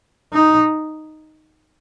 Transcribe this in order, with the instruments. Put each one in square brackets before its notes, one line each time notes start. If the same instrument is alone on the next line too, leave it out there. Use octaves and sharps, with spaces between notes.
[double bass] D#4